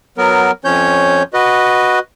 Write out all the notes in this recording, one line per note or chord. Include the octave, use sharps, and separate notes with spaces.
F#3 B3 A#4
F2 F3 C#4 C#5 G6
F#4 B4 D#5